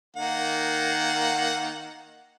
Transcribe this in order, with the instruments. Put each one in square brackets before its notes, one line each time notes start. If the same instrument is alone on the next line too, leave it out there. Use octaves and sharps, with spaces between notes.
[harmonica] D#3 A#3 F#5